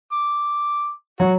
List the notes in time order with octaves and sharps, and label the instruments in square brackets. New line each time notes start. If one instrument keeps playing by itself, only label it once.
[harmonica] D6
[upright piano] F#3 [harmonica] F#4